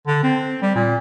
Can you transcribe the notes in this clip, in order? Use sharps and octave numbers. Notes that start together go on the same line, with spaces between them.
D3
C4
G3
A#2